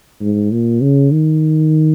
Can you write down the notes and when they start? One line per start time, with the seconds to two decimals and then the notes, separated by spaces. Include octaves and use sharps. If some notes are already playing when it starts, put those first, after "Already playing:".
0.21 G#2
0.51 A#2
0.81 C#3
1.12 D#3